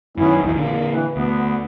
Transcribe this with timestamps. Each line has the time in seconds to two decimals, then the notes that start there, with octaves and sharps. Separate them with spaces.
0.17 F#2 D#3 B3 C#4 E4
0.42 A#1 E2 D#4 E4
0.57 A#2 D3 A#3
0.90 E3
1.16 D2 B3